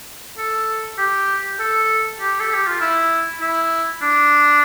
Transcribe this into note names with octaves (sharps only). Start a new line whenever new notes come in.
A4
G4
A4
G4
A4
G4
F4
E4
E4
D4